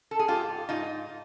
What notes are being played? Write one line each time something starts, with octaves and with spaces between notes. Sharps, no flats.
A4
G#4
G#2 F4 G4
G#2 D#4 F4